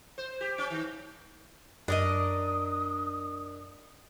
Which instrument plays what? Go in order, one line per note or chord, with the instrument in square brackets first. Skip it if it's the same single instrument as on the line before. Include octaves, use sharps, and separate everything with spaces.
[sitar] C5
G4
C#4
D#3
[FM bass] F#2 [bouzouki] D4 A#4 D#5 [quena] D#6